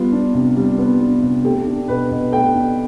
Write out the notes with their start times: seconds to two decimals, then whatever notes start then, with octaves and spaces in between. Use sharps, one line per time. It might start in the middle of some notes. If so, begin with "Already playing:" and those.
Already playing: G3 B3 F4
0.12 D4
0.34 C3
0.57 G3
0.78 B3
1.01 D4
1.23 C3
1.45 A3 G4
1.67 D4
1.88 B2 B4
2.10 B2
2.32 A3 G5
2.54 D4